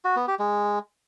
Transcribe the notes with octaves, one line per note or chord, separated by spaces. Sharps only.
F#4
B3
G4
G#3